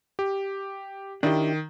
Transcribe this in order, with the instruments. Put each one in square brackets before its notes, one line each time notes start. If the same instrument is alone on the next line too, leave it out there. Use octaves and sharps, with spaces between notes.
[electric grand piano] G4
[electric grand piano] D#3 [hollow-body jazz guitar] D4 E4 G4